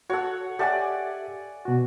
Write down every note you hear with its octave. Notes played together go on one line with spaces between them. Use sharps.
F#4 A4 C#5 F#5
G4 A4 D5 E5 F#5 G#5
B2 F#4